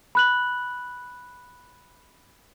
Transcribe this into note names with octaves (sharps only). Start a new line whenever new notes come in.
B5 F#6 F#7